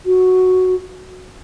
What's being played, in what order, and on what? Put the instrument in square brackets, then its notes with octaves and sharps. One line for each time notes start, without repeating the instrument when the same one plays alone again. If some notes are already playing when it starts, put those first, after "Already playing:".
[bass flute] F#4